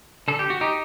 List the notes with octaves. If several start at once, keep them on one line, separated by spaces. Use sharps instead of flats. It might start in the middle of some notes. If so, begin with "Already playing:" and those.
D3 A4
G4
F#4
D#4 G4